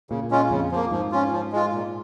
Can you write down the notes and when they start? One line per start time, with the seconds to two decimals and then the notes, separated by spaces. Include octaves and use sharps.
0.10 A#2 C#3
0.31 G#3 C#4 F4
0.50 F2 C#3
0.71 F3 A#3
0.91 G#2 F3
1.12 C#4 F4
1.32 F3
1.52 G#3 F4
1.72 A#2